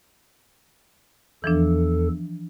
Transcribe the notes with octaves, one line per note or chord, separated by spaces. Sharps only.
E2 E3 F3 D4 A4